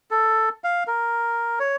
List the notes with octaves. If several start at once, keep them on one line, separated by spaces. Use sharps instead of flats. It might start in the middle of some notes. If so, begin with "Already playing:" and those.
A4
F5
A#4
C#5